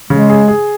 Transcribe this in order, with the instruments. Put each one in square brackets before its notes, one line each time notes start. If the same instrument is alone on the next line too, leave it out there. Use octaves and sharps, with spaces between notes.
[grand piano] C#3 [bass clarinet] G#3
[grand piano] G#4
G#4